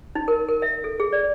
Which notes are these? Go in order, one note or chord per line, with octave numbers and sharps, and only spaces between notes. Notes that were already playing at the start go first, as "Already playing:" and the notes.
D#4
A#4
A#4
E5
A4
G#4
D5